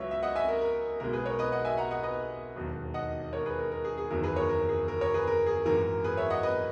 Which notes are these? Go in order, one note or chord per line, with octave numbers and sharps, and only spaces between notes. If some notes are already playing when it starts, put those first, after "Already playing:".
Already playing: C#2 C#3 F#3 B4 C#5 E5
E5
D#5 F#5
E5 G#5
A#4
A#4
B1 B2 G#3 A#4
G#4 B4
A#4 C#5
B4 D#5
D#5 F#5
E5 G#5
F#5 A#5
D#5 F#5
B4 D#5
E1 D#2 D#3 F#3
D#5 F#5
A#4 C#5
G#4 B4
A#4
A#4
G#4
G#4
F#1 E2 D#3 F#3 A#4
G#4 B4
A#4 C#5
A#4
G#4
A#4
A#4 C#5
G#4 B4
A#4
G#4
G#1 F#2 E3 A#4
G#4 B4
C#5 E5
D#5 F#5
B4 D#5